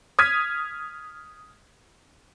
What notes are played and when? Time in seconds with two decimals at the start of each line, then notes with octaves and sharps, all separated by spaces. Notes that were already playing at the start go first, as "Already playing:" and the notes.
0.19 D#6 F6 G#6 B6 D#7